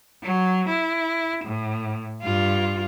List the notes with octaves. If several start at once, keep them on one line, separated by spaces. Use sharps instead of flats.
F#3
E4
A2
G2 F4